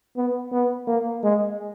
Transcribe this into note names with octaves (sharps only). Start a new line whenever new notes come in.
B3
B3
A#3
G#3